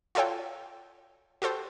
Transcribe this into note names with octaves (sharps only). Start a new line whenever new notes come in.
F4 F#4 A4 C#5 G5
F#4 G4 A4 C5